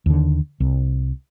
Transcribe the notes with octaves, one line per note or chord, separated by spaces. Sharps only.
D#2 D3
C2